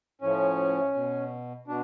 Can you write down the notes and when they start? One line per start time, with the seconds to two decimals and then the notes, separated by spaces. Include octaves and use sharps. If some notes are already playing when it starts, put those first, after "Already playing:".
0.21 A2 F3 C#4
0.94 B2
1.67 B2 D4